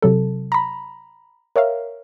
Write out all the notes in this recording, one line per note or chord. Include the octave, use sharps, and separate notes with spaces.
C3 F#3 A4
A#5 B5
A#4 C#5 E5 F5